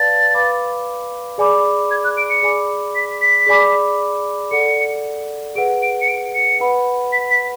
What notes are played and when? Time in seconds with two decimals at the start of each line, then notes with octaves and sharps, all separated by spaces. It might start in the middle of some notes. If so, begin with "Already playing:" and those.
Already playing: B4 D5 F5 A5 A6
0.34 B4 F5 B5 D6
1.38 G#4 D5 G#5 B5 D6
1.91 G#6
2.04 F#6
2.17 D7
2.30 C#7
2.43 G#4 D5 G#5 B5 D6
2.95 B6
3.21 B6
3.47 G#4 D5 G#5 B5 D6
4.51 A4 D5 F#5 C#7
5.55 G#4 B4 F#5 D7
5.82 D7
6.01 C#7
6.08 D7
6.34 C#7
6.60 B4 F#5 B5
7.12 B6
7.30 B6